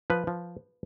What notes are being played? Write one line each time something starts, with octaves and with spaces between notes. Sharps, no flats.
F3 B4
F3